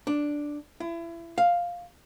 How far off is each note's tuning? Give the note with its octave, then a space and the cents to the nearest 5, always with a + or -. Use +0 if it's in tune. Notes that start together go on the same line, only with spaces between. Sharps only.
D4 +0
E4 +30
F5 +5